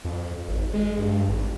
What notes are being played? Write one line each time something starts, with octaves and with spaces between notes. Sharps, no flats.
F2
G#1
G#3
G2
G#1